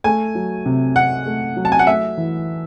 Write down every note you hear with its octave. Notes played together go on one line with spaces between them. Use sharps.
A3 G#5
F#3
C3
C3 F#5
A3
F#3
A5
G#5
F#5
A3 E5
E3